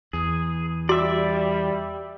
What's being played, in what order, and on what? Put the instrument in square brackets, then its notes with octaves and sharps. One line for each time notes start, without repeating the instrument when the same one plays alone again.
[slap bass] E2 [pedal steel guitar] G#4
[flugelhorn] G3 [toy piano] F#4 C6 [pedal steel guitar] D5 E5